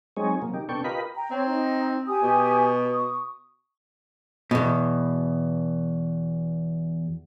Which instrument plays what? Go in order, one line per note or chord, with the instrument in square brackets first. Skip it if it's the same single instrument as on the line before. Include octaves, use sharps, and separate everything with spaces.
[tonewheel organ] F#3 G#3 C4 D#4 G#4 C#5
C3 F#3 A#3
D#4 G4
C3 B3 D4 A4 G5 C#6
F4 G4 A#4 B4 D#5 B5
[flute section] G5 A#5
[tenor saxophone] C4 [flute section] C#5
[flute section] D#4
G4 G#5 D#6
[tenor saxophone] B2
[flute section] C#6 D#6
[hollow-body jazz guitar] E2 B2